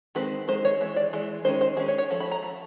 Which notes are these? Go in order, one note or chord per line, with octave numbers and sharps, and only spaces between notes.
D#3 G#3 C4 B4
D#3 G#3 C5
C#5
E3 G#3
D5
E3 G#3
D#3 G#3 C#4 C5
C5
D#3 G#3 C#4 G#4
C#5
C#5
F3 A3
B5
A#5
F3 A3